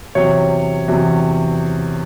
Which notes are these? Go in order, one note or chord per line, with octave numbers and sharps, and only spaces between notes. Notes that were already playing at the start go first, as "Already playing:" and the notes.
E2 C3 F#3 C#5
E2 C3 F#3